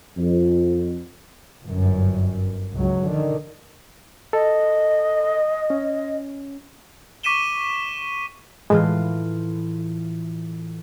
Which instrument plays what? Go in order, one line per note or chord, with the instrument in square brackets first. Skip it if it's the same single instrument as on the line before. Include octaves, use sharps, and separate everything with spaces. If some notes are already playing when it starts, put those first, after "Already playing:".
[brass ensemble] F2
[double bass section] G1 F#2
C#2 F#3
D3 D#3
[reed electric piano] A4 [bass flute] D#5
[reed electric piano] C#4
[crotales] C#6 D6 B6 D#7 E7 G7
[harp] A2 E3 F4 [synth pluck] G#3